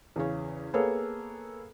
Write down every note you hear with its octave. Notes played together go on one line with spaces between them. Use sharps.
E2 C#3 C#4
A#3 B3 G#4 A4 C#5